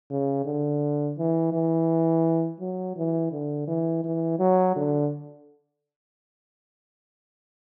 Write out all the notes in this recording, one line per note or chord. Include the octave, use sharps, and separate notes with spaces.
C#3
D3
E3
E3
F#3
E3
D3
E3
E3
F#3
D3